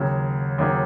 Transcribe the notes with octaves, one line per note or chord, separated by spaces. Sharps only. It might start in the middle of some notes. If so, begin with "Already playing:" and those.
Already playing: D#2 C#3 F#3
D#2 C#3 F#3